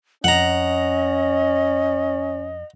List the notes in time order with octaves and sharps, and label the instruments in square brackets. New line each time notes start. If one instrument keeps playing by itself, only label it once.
[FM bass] F2 [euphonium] C#4 [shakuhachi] D#5 [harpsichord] F#5 A#5